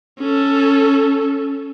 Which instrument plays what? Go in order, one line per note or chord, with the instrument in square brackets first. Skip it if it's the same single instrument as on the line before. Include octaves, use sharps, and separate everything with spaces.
[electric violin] C#4 A4